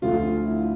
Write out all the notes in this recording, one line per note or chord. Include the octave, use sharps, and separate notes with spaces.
D2 D3 F3 A3 F4
E4